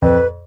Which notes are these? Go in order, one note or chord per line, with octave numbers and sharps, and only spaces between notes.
F2 B4